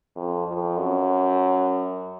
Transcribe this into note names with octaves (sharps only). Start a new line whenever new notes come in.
F2
F2
F#2